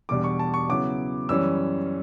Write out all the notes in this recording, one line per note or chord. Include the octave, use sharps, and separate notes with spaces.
E2 B2 G3 D4 D6
C#6
A5
C#6
C#3 F#3 B3 E4 D6
F#2 E3 G3 C#4 E6